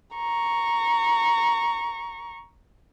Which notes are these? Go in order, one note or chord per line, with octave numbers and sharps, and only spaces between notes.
A#5 C#6